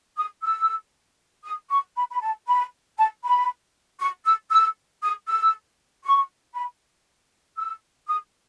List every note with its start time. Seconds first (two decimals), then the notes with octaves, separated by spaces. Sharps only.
0.17 D#6
0.43 E6
1.45 D#6
1.70 C#6
1.96 B5
2.10 B5
2.22 A5
2.47 B5
2.98 A5
3.24 B5
4.00 C#6
4.25 E6
4.51 E6
5.02 D#6
5.28 E6
6.04 C#6
6.55 B5
7.57 E6
8.08 D#6